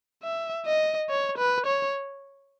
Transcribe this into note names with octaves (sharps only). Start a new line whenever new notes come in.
E5
D#5
C#5
B4
C#5